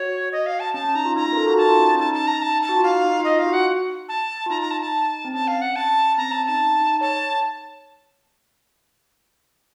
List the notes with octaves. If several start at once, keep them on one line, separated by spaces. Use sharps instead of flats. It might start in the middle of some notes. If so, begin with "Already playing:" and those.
Already playing: F#4 C#5
D#5
F5
A5
C#4 A5
C#4
D#4 A#5
F4
D#4 A#5
F4
A#4
A4
F#4
D#4 A5
F4
C#4
C#4
D#4 A5
A5
A#5
A5
A5
F#4
F4
D#4 F5
D#4
F4
D#4 D#5
F4 F5
F#4
F#5
A5
F4
D#4 A#5
A#5
A5
A5
C4
C#4 A5
F5
F#5
A5
C4 A#5
C#4 A5
D#4 A5
D#4
C#5 A5